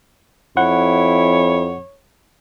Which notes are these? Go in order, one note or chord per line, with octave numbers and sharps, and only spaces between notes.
F2 E4 C#5 F#5